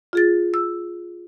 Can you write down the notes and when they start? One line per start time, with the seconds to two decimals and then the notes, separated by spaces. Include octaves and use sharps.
0.13 F4 G#4 A6
0.54 E6